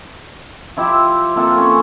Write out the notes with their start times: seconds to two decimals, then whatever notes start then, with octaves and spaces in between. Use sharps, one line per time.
0.77 F3 E4 G4 E5
1.35 A#3 C4 F4 A4
1.58 C#4